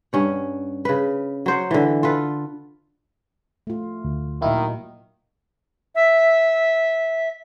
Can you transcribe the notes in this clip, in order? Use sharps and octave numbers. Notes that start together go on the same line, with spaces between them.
G2 C#4 F#5
C#3 B4
F#3 C5 F#5
D3 E3
F4 A4 B4
A3 F4
D2
A#2 D#3 F#3 A#3 E4 F5
E5